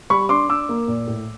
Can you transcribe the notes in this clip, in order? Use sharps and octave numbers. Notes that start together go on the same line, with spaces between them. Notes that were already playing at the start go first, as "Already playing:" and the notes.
G3 B5 C#6
D4 C6 D6
D4 D6 E6
A#3
A#2
A2